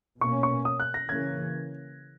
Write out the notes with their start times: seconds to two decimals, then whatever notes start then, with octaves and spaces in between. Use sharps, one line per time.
0.21 B2 A#3 C#4 C#6
0.43 C#6
0.65 D#6
0.80 F#6
0.94 A#6
1.08 C#3 E3 A#3 C#4 G#6